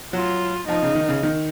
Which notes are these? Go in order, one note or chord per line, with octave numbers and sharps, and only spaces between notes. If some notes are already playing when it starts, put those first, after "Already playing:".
F#3 F4
F3 D#4
C#3
D#3
C#3
D#3